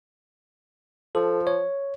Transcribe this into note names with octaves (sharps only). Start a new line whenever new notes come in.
F3 A4
C#5